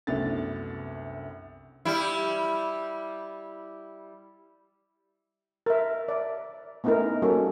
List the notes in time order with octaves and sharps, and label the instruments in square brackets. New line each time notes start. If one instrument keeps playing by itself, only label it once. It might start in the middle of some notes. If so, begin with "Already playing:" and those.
[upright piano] C2 F#2 A3 B3 D4 A6
[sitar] G3 E4
[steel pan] A#4 E5
D5 E5
A3 B3 C#4 D#4 E4 A#4
G3 A#3 C#4 F#4 A4